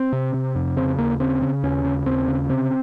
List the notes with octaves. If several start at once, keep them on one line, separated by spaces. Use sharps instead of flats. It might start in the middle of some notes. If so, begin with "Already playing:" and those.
Already playing: C4
C3
C3
F2
C#3 C4
D#2 A#3
C#3 C4
C#3
D#2 C#4
C#3
D#2 C4
C#3
C3 C4